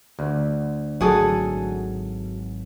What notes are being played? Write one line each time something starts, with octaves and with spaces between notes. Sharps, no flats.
D2
G#1 E3 F#3 F#4 G#4 A4